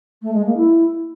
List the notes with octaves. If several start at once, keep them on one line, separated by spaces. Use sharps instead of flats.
A3
G#3
A#3
E4